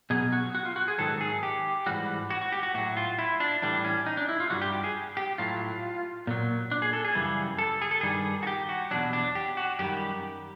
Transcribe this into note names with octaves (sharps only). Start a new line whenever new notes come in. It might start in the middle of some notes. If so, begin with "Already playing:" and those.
B2 F#3 G#4
F#4
F#4
F4
F#4
G#4
G#2 D#3 F#3 A4
G#4
G4
G#2 E3 G3 F#4
F#4
F#4
G4
F#4
A2 F#3 F#4
F4
E4
D4
A2 E3 G3 D4
C#4
D#4
D4
E4
F4
G2 D#3 G3 F#4
G4
G4
G#4
G4
A2 F#3 F4
A#2 F#3
D4
G#4
A4
G#4
F#2 C#3 E3 G3
A4
G#4
A4
G2 D#3 G3 G#4
F#4
G4
F#4
E2 B2 F#3 D4
D4
G4
F#4
F#2 D#3 G3 G4